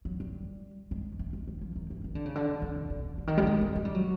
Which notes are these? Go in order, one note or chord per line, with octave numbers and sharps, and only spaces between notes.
F#3
G3
G#3
A3
G#3
G3
F3
D#3
E3
D#3
D3
C#3
D3
C#3
C3
C3
C#3
D3
D#3
G3
A3
G#3
A3
G#3
G3
F#3